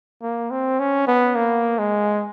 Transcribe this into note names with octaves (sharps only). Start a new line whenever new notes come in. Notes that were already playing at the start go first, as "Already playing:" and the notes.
A#3
C4
C#4
B3
A#3
G#3